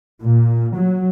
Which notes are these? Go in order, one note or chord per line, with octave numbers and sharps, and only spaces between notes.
A#2
F#3